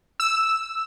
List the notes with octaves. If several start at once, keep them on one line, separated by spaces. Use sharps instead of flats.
E6